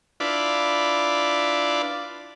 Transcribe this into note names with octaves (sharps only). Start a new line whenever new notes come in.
D4 E4 F4 B4 D5